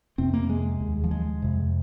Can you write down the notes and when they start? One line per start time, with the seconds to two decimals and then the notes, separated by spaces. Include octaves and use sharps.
0.18 F2 C3 C4
0.34 A#3
0.49 G#3
0.80 D#2
1.04 F3
1.11 G#3
1.42 F2 C3